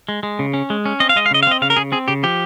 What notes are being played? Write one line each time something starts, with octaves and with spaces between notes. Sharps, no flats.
G#3
G#3
C#3
C#4
G#3
C#4
C4 D#5
F5
G#3 D#5
F5
C#3 D#5
F5
C4 D#5
C#3 F5
A#4
C#3 G#4
C4 G#4
C#3 G4
F3 G4